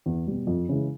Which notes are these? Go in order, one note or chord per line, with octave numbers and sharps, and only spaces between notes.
E2
B2 G3
F2
C#3 E3 G#3